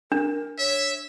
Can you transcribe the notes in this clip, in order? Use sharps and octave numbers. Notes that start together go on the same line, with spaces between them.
D4 A#4
C#5 E5